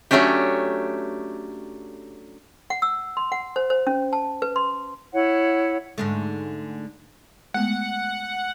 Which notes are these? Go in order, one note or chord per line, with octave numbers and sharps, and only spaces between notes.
F#3 A3 C#4 D4 G4
F#5
E6
C6
F#5
C5
C5
C#4
A5
B4
C6
E4 C#5 F#5
G#2 D3 A3
G#3 A3 B3 F#5